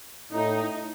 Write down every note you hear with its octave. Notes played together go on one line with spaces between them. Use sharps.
A2 D#4